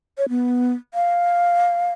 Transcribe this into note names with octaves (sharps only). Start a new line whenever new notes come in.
C#5
B3
F5